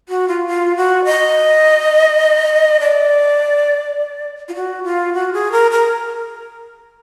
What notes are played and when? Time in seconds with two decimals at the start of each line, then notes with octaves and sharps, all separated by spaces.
0.09 F#4
0.28 F4
0.47 F4
0.77 F#4
1.05 D#5
2.80 D5
4.48 F4
4.55 F#4
4.84 F4
5.14 F#4
5.33 G#4
5.52 A#4
5.71 A#4